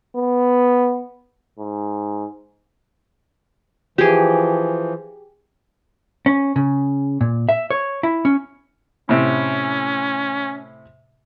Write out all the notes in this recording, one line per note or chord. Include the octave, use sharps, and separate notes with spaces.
B3
G#2
E3 F3 G4 G#4
C#4
C#3
A#2
E5
C#5
E4
C#4
A2 C3 C#4